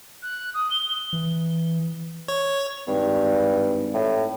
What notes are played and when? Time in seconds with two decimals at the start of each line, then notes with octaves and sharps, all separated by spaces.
0.23 F#6
0.54 D#6
0.71 G7
1.13 E3
2.28 C#5
2.87 G#1 G2
3.94 A2